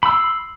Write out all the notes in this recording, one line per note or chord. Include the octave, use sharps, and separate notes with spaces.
B5 C6 E6